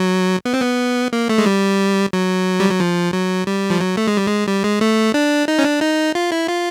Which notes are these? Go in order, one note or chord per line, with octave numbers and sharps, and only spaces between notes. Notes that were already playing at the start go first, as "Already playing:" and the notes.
Already playing: F#3
B3
C4
B3
A#3
A3
G#3
G3
F#3
G3
F#3
F3
F#3
G3
F3
F#3
A3
G#3
G3
G#3
G3
G#3
A3
D4
D#4
C#4
D4
D#4
F4
E4
F4